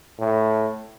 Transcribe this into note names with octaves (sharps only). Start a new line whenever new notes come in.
A2